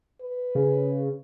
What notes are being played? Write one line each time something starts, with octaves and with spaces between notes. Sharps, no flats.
B4
C#3